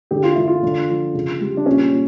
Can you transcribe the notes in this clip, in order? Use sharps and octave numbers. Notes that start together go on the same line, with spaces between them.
D3 G4
F4
D3 E4
F4
D3
F3
C#3
G3
D4
A#2 C#4
A#2